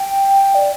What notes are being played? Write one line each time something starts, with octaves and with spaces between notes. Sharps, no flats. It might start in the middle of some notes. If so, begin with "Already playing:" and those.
Already playing: G5
D5